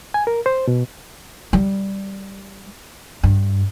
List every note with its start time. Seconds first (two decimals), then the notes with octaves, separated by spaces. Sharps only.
0.14 G#5
0.27 A#4
0.46 C5
0.68 B2
1.53 G3
3.23 G2